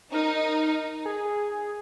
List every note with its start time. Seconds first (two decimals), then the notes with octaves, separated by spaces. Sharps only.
0.13 D#4 A#4
1.05 G#4